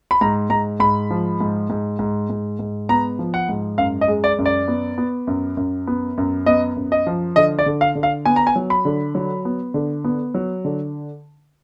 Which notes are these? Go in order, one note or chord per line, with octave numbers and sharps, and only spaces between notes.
B5
G#2 A#5
G#2 A#5
G#2 B5
F3
G#2
G#2
G#2
G#2
G#2
B3 A#5
F3
F#5
G#2
F#2 F5
D#5
G#3
D5
F#2
D5
B3
B3
F#2
F#2
B3
F#2
B3 D#5
F#2
D#5
F3
D3 D#5
D5
D3
F5
D3
F5
B3 G#5
A#5
G#5
F#3
B5
D3
F#3
B3
D3
B3
F#3
D3